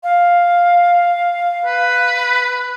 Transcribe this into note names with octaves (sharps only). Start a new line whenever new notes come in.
F5
B4